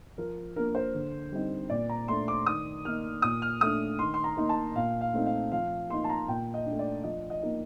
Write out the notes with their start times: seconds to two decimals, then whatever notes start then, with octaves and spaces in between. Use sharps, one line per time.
0.18 F3 A#4
0.56 A#3 D4 A#4
0.75 C5
0.94 D3
1.32 G3 C4 D#4
1.70 A#2 D5
1.89 A#5
2.08 A3 D4 C6
2.28 D6
2.46 D#3 D#6
2.85 A#3 D#4 F6
3.22 A#2 D#6
3.42 F6
3.61 A3 D4 D#6
3.99 D#3 C6
4.14 C6
4.24 A#5
4.37 A#3 D#4
4.49 A5
4.76 A#2 F5
5.01 F5
5.13 A3 C4 D#4
5.26 F5
5.52 F3 F5
5.90 A#3 D#4 C6
6.04 A5
6.09 A#5
6.28 A#2 G5
6.54 D#5
6.66 A3 D4
6.79 D5
7.04 F3 D#5
7.30 D#5
7.43 A#3 D#4